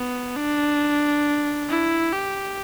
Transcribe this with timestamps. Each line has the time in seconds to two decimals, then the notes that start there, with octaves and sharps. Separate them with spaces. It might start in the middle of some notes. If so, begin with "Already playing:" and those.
Already playing: B3
0.36 D4
1.69 E4
2.13 G4